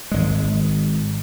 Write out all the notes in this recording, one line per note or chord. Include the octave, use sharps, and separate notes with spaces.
G#1 G#3